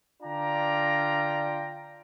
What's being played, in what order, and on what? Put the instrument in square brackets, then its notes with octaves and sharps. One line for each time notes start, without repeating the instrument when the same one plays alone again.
[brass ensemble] D3 D4 F4 D5 G5 A#5